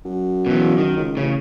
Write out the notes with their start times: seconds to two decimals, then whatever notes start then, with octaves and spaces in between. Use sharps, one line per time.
0.05 F#2
0.46 B2 E3
0.78 D#3
0.97 C#2
1.17 A1 C#3